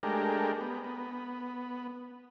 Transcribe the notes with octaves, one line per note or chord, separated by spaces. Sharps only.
G#3 A3 D4 G4 A#4
B3
B3